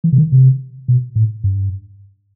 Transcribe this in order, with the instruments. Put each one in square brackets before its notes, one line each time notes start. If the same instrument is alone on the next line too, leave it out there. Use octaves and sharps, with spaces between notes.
[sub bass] E3
C3
D#3
C3
B2
A2
G2